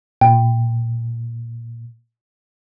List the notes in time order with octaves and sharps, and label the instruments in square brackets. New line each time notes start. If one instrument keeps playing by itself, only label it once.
[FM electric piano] A#2 [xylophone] G5